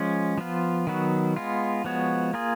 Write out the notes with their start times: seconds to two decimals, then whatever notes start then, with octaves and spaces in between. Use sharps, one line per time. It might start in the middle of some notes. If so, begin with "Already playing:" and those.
Already playing: F3 G#3 C#4
0.38 F3 B3 F4
0.87 D#3 F#3 B3 F#4
1.36 G#3 B3 F4
1.84 F3 G#3 B3 F#4 C#5
2.34 A#3 F4 G#4